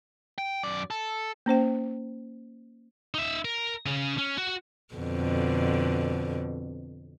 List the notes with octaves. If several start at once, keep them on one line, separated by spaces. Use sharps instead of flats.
G5
F#2 D5
A4
A#3 C#4 C5 G5
D#4 E5
A#4
C#3 C#4
C#4
F#4
F2 B2 D3